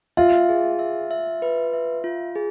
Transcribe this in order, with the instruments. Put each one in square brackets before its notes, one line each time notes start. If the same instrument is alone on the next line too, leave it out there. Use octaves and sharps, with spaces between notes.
[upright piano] F4 [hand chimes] E5
[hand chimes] G#4
E5
E5
B4
E5
F4
G#4